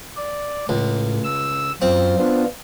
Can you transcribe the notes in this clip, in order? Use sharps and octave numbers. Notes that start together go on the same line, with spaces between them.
D5
C#2 A2
E6
F#2 C4 F4
B3 D4 F4